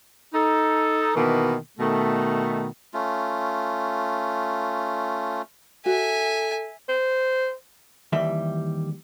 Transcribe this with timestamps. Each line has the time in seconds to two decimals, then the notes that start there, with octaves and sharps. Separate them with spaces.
0.34 D#4 A4
1.15 B2 D#3 E3 A#3
1.79 B2 D#3 A3
2.94 A3 C#4 F4
5.86 F#4 A4 E5 G#5
6.89 C5
8.12 D#2 E3 G3 E5